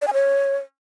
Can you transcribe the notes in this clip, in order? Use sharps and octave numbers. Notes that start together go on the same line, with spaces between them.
D5
G#5
C#5